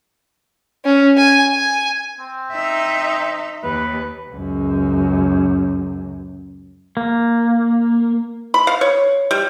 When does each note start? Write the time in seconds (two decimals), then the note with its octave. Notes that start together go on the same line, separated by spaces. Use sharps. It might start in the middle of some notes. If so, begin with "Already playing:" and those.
0.85 C#4
1.18 G#5
1.55 G#5
2.20 C4
2.52 D#4 E5
3.64 D#2 B4
4.31 C#2 F#2
6.97 A#3
8.54 B5
8.67 F5
8.81 C#5
9.31 G3